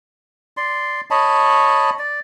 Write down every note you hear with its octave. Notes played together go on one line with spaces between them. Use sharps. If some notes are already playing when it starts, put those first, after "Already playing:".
D5 C6
C#5 D#5 A5 B5
D5